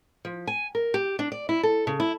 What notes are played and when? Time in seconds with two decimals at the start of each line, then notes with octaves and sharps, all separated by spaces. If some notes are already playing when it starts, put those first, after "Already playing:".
0.25 F3
0.47 G#5
0.75 A#4
0.94 G4
1.19 D4
1.32 D5
1.49 E4
1.63 A4
1.87 C#3
2.00 E4